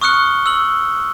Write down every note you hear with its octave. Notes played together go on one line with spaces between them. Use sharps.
C#6 D#6 F6 F#6 C#7 G7
E6 F#7